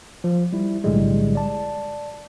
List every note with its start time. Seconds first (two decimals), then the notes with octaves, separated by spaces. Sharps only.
0.24 F3
0.53 G3 E4
0.84 B1 A2 D3 G3 G#3
1.35 D5 A5